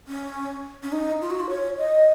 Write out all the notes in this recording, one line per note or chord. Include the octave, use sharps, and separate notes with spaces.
C#4
C#4
D#4
F4
F#4
F4
C#5
D#5